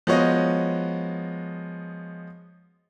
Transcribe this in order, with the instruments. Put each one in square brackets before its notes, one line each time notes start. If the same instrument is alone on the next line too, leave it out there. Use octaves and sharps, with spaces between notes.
[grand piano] F3 G#3 B3 F#4 C#5 D#5